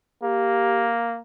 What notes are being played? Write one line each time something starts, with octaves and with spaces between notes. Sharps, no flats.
A#3 G4